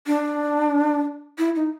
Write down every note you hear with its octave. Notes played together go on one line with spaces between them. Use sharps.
D4
E4
D#4